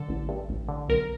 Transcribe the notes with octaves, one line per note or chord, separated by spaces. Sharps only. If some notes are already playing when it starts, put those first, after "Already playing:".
Already playing: D3 A4
A1
G2
A1
D3
B1 A#4